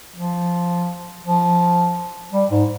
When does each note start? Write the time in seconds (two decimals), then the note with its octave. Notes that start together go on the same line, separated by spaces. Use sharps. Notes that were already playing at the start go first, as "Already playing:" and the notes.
0.16 F3
1.24 F3
2.33 G3
2.50 G#2